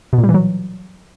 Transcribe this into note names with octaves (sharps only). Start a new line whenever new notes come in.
B2
A#2
G3
E3
F#3